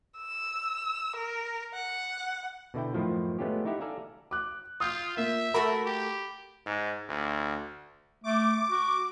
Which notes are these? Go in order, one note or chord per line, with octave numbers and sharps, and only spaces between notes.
E6
A#4
F#5
B2 D3 E4 G5
F#2 A2 D#3 F3 E4 F4
G#3 A3 B3 C#4 F4 G4
D#4 E4 G4 E5 F#5
A4 D5 E5 F5 G#5 A#5
D6 F#6
F4 D#6 G6
A#3 F4 E5
A3 F#4 A#4 B5
G4
G#2
D2
A3 D6
F#4